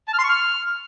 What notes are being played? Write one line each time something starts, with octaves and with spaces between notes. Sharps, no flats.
A5
F6
C6
C#6
F6